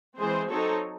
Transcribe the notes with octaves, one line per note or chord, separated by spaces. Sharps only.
E3 G#3 C4 G#4 C5
F#3 C4 D#4 A4 C#5